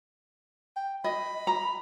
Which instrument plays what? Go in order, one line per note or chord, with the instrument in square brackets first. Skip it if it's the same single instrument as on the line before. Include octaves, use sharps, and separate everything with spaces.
[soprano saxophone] G5
[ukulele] D#5 [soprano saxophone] B5
[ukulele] A#5